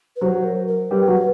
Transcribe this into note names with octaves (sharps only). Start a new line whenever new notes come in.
B4
F#3 F#4 C5
A#4
A#4
G3 G4 B4
F#3 F#4